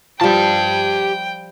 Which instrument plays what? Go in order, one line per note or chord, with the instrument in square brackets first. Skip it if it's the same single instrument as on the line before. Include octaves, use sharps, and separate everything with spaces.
[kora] F3 G3 [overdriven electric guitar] G4 A5 [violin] G5